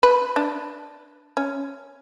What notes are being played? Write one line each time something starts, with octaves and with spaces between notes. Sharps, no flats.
B4
D4
C#4